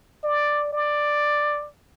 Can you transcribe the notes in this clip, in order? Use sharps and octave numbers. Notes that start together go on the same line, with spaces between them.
D5
D5